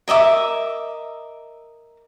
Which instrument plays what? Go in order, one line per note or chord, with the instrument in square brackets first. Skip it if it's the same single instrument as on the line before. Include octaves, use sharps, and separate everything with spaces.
[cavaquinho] A#4 D#5 E5 D6